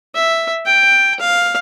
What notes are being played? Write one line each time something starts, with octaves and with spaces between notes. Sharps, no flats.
E5
G5
F5